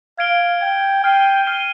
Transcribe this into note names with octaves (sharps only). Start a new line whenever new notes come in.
F5 G#6 D7 G7
G5 G#6 D7 G7
G5 F6 C7 D#7 G7
F6 C7 D#7 G7